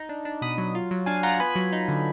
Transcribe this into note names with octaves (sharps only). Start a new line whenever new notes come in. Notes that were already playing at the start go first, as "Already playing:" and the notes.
Already playing: D#4
D4
D4
B2 B5 D#6
F#3
F4
F#3
D4 F5 G#5
F4 F#5 A#5
B3 G#5 B5
F#3
D#4
D3